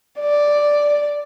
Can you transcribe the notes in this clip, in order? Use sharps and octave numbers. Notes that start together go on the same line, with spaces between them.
D5